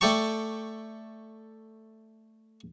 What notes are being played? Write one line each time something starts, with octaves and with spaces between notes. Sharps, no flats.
A3 A4 D5 G5 A5 C#6